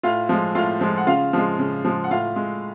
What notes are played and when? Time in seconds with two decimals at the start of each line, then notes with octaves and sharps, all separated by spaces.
0.03 A2 F4 F5
0.29 F3 G#3
0.55 A2 F4 F5
0.81 F3 G#3
0.98 F#5
1.07 C#3 F4 F5
1.33 F3 G#3
1.59 C#3
1.85 F3 G#3
2.04 F#5
2.11 A2 F4 F5
2.36 G#3